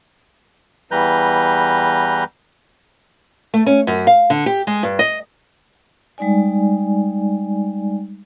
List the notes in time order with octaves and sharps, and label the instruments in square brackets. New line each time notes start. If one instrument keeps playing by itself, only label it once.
[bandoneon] E2 E3 G3 B4 A#5 G6
[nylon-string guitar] A3
C#4
F#2
F5
D3
G4
G#3
G2
D#5
[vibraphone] G3 G#3 D#4 D5 G#5